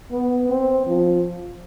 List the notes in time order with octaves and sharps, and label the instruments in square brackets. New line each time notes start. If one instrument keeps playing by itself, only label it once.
[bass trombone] B3
C4
F3